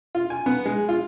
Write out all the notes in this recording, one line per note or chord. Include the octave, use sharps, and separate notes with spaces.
F4
G#5
B3
G#3
F4